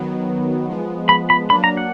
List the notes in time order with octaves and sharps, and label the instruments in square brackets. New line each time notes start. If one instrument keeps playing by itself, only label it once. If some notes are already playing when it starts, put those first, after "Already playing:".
Already playing: [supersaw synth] D#3 F#3 B3
F3 G#3 B3
[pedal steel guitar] B5
B5
[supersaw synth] F#3 A#3 D4 [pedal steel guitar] B5
[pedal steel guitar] A#5
F#5